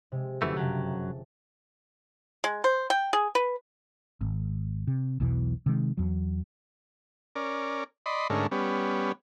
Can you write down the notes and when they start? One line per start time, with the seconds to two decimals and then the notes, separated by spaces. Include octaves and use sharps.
0.12 C3 G#3
0.42 F1 F#2 D3 E3 A3
0.57 F#2 C#3 F#3 G5 A5
2.44 G#3
2.64 C5
2.90 G5
3.13 G#4
3.35 B4
4.21 G#1
4.87 C3
5.20 B1 E2 B2 E3
5.66 C3 D#3 G#3
5.97 E2 F#3
7.36 C#4 A#4 D5
8.06 D5 D#5 B5 C6
8.30 G#2 D3 A3 C#4 A#4
8.51 G3 B3 C#4